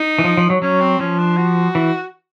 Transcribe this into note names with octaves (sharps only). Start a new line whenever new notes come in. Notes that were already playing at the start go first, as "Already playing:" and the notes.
Already playing: D#4
E3
F3
F3
F#3
F#3 C#4
C4
F3 C#4
D4
F#4
E3